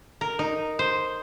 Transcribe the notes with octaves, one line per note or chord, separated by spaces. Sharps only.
A#4
D#4
C5